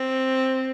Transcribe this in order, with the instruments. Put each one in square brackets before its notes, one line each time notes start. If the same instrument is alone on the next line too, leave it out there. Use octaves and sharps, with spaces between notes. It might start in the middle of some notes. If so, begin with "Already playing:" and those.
Already playing: [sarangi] C4